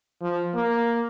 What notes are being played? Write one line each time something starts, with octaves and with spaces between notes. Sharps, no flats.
F3
A#3